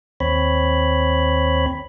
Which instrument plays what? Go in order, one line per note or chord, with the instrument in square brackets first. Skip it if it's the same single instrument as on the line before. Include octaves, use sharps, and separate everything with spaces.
[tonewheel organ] D#2 C4 C#5 B5